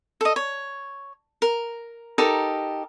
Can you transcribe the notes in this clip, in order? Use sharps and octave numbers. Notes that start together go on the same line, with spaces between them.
A4 D#5
C#5
A#4
D#4 G4 A4 A#4